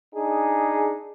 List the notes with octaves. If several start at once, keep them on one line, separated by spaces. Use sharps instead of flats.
D4 D#4 G#4